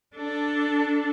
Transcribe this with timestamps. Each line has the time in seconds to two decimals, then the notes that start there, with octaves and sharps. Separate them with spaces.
0.16 D4 A4